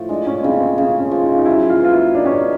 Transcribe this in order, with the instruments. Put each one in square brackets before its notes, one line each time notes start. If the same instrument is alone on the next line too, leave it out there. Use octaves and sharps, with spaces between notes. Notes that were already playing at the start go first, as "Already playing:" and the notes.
Already playing: [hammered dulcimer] A2 F3
[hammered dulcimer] G#3 [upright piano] D4
[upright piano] C#4
[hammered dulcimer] C#3 [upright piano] C4
[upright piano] C4
[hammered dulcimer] C#3 [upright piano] C4
[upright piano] C#4
[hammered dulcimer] F3
[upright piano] D#4
D#4
[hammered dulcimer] F#3 [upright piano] E4
[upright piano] F4
[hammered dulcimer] B3 [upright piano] F4
[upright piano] E4
[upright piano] D4 [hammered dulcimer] D#4
[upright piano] C#4
D4